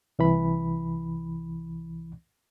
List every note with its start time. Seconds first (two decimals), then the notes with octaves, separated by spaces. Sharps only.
0.19 C2 E3 B5